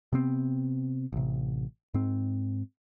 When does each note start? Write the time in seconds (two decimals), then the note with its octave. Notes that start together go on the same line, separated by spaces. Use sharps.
0.13 C3 B3 C4
1.13 A1 C3
1.94 G#2 C4